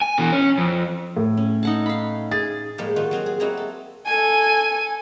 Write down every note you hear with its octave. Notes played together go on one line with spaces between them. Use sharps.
G#5
B2 E3
C#4
F2
A2
C#4
D#4 F#5 A5
F5 B5
G#4 A6
A2 F3 G3 G#3 A#3
D#3 F4 F#4
F#3 C4 F4 G#4
G#4
F#3 A#3 C4 D#4 E4 F#4
A4
A4 G#5